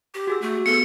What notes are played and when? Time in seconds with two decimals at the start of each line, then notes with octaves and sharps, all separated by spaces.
0.14 G4
0.27 F#4 G#4 E6
0.42 A3
0.66 B3 A4 C#7